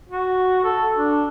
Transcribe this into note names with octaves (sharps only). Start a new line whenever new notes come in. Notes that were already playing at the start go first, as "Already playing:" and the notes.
F#4
A4
D4